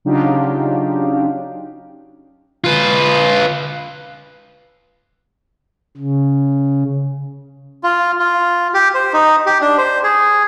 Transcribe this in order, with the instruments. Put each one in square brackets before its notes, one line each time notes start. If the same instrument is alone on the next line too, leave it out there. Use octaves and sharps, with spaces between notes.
[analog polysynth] C#3 F#3 D4 D#4 F4 G4
[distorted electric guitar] F4 B4
[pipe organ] C#3
[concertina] F4
F4
G4
C5
D#4
G4
D4
C5
G#4